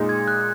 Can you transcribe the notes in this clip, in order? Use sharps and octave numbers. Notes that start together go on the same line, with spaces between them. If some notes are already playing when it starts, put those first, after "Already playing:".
Already playing: A#2 G#3 D#4
G#6
F#6